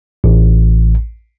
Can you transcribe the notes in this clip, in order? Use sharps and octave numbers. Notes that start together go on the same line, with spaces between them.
A1